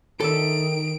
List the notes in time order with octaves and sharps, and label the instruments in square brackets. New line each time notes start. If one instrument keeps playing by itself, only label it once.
[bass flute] D#3 [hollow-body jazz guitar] A4 D5 E5 [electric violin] D7